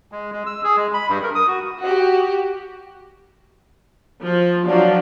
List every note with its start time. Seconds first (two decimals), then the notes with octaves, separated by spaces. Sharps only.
0.12 G#3
0.32 G#3
0.46 E6
0.64 G#4
0.76 G#3
0.94 B5
1.09 G2
1.23 A#4
1.35 D#6
1.47 F#4
1.82 F#4 G4
4.24 F3
4.66 F3 F#3 D4